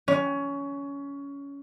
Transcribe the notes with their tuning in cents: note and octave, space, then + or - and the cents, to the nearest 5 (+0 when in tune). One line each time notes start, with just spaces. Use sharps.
C#4 +20